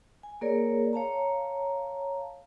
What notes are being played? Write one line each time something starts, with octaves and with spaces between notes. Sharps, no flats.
G#5
A#3 G#4 A#4 C#5 D5
C#5 F5 A5 A#5